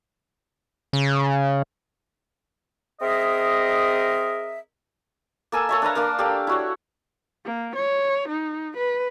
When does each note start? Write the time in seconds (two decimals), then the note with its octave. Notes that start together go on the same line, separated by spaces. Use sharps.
0.93 C#3
3.01 C4 G#4 A#4 D#5 E5
5.52 A#3 A4 G#5 E6
5.69 A4 C#5 E5
5.82 D4 B4 F5 A#5
5.95 A#3 D4 A#4 F5
6.19 G4 A4 D5 F5
6.47 E4 F#4 C#5
7.45 A#3
7.76 C#5
8.28 D#4
8.77 B4